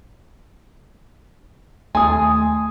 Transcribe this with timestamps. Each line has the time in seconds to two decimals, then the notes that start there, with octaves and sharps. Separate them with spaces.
1.95 D#2 A3 G#5 C6 D#6